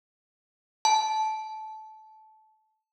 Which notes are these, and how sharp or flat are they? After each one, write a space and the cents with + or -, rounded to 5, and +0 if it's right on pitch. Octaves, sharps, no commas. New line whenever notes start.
A5 -20